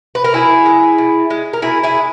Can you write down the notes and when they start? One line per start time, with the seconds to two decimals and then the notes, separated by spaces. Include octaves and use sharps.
0.15 B4
0.24 A#4
0.33 B2 E4 G#4
0.66 G#3
0.98 B2
1.30 G#3
1.53 A#4
1.62 B2 E4 G#4
1.83 E4 G#4
1.94 G#3